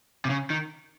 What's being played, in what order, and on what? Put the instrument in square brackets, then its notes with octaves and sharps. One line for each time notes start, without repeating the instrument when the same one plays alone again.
[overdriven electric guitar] C3
C#3
D#3